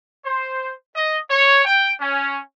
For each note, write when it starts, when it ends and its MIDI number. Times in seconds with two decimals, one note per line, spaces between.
0.24 0.71 72
0.95 1.16 75
1.29 1.62 73
1.65 1.91 79
2.00 2.38 61